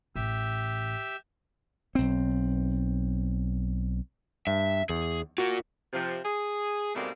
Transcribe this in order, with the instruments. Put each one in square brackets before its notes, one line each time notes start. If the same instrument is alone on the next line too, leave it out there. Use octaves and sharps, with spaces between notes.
[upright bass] A1 [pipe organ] G4 E5
[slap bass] B1 C4
[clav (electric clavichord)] G2 [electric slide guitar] E5
[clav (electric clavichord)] E2 [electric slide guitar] G#4
[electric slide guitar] F4 A#4 [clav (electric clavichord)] F#4
[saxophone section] C3 F3
G#4
G#2 B2 G3 A3 A#3 C4